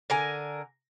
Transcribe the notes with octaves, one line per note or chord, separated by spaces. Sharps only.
D3 A#4 G#5